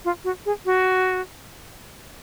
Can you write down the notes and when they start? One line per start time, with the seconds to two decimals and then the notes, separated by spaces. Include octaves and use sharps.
0.05 F4
0.24 F#4
0.46 G#4
0.66 F#4